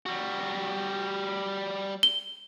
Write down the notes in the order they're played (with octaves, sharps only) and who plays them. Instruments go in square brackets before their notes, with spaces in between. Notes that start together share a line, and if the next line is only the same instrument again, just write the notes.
[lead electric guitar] G3 F#4
[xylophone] G7